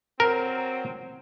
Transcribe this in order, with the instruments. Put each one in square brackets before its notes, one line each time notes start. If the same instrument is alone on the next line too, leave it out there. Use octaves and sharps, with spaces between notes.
[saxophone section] F#3 C4 [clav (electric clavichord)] A#4